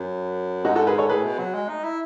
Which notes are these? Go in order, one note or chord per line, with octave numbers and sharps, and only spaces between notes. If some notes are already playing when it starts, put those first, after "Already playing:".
Already playing: F#2
G#2 D#4 F#4
F#4 A4
G#4 B4
A4 C#5
A2 G#4 B4
B2
F#3
G#3
D#4
E4